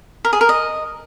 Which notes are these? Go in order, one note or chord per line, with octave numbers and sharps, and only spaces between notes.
A#4
G#4
A#4
D#5